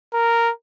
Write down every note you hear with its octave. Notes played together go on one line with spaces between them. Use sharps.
A#4